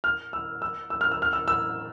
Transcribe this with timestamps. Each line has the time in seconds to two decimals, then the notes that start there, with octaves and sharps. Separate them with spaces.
0.04 F6
0.33 E6
0.62 E6
0.90 E6
1.01 F6
1.12 E6
1.22 F6
1.33 E6
1.48 E6